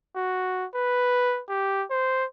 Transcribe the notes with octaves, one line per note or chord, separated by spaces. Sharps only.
F#4
B4
G4
C5